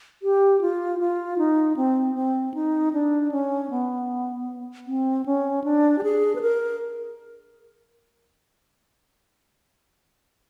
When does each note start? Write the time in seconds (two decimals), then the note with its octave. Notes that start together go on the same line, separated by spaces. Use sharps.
0.23 G4
0.61 F4
1.00 F4
1.38 D#4
1.77 C4
2.15 C4
2.54 D#4
2.93 D4
3.32 C#4
3.70 B3
4.87 C4
5.26 C#4
5.64 D4
5.98 G4
6.03 G#4
6.36 B4
6.41 A#4